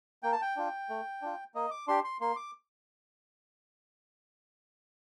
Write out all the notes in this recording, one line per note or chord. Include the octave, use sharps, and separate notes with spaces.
A#3 G5
A5
G5
D4 F4
A3
D4 F4
A#3 D#5
D6
D4 G4 C6
C6
A#3 C6
D6